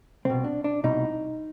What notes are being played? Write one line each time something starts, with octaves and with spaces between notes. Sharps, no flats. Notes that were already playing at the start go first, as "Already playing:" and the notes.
C2 B2 C4
D4
D4
C2 B2 D#4